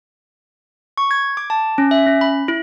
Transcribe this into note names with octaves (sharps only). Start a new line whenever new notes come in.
C#6
G#6
D6
A5
C#4
E5
C#4
B5
E4